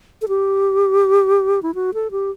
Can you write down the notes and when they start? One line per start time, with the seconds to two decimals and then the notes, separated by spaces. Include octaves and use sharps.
0.22 A4
0.28 G4
1.63 E4
1.75 F#4
1.94 A4
2.11 G4